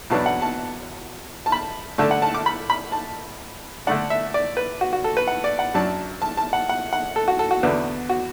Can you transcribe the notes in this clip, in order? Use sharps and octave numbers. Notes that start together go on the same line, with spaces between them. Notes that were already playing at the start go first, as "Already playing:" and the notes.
E2 B2 F#3 B3 D4 A5
F#5
A5
A5
B5
D3 A3 D4 A5
F#5
A5
D6
B5
B5
A5
D3 A3 D4 F#5
E5
D5
B4
F#4
F#4
A4
B4
F#5
D5
F#5
F#2 F#3 D4 A5
A5
A5
F#5
F#5
F#5
A4
F#4
A4
F#4
E2 D3 B3 D4
F#4